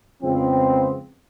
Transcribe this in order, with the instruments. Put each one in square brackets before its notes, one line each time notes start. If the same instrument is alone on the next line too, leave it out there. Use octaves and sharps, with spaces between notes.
[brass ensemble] F2 C#3 F3 G#3 B3 C4